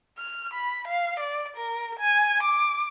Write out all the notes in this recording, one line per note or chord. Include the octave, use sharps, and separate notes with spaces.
F6
B5
F5
D5
A#4
G#5
D6